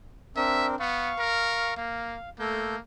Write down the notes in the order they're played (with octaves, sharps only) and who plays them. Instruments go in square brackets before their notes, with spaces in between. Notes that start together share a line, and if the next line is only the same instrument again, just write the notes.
[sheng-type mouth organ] C4 D4 A#4 [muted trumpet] E5
[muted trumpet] B3 [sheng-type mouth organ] F5 C#6
[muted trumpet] A#4
[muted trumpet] A#3 [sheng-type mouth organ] F5
[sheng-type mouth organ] A3 A4 G6 [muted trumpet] A#3